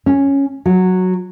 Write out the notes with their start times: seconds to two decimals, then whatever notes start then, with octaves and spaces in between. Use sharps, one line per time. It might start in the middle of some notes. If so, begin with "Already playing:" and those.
0.06 C#4
0.66 F#3